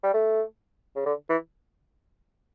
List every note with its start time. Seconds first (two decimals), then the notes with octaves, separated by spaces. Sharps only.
0.03 G3
0.14 A3
0.96 C#3
1.06 D3
1.29 E3